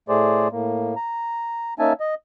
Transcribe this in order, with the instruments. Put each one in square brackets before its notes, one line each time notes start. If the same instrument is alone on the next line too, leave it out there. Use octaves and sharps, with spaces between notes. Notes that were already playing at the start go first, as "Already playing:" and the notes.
[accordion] A2 A3 G#4 C5 D5
A2 A#3
A#5
A#3 C#4 D#4 E5 G#5 A5
D#5